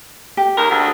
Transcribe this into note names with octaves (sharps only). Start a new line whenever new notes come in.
G4
D#2 C#3 A#4
D2